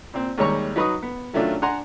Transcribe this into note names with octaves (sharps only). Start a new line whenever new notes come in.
A#2 C4
D#2 G3 G#3 C#5 A#5 C#6
F#3 D#4 B4 C#6 D#6
B3
D#3 F#3 A3 C#4 D4 F4
D4 F#5 G#5 A#5 C6